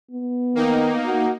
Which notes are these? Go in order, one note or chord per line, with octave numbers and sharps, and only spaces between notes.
B3
D#3 A#3 D#4
F#4